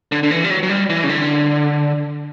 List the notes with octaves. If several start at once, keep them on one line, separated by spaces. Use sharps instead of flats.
D3
D3
E3
G3
F#3
F#3
G3
E3
C#3
D3